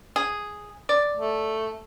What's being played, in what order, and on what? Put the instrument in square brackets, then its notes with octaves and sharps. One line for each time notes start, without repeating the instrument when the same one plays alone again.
[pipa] G#4
D5
[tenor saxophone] A3